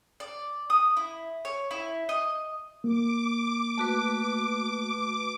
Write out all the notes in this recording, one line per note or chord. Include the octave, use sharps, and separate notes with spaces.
D5
D#6
E4
C#5
E4
D#5
A#3 D6
A3 F#4 B4